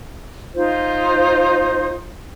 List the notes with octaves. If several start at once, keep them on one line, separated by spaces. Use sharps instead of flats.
D#4 F4 C5